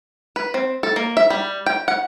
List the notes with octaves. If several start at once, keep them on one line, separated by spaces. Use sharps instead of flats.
B4
C4
A4
A#3
E5
G3
G5
F#5